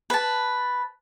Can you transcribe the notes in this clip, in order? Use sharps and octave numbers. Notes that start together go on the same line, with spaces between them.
B4 A5